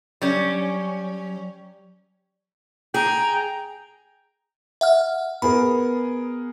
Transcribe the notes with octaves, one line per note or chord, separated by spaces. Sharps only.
F#3 G3 C#4
G#4 G5 A#5
E5 F#5 F6
B3 G#4 A#4 B5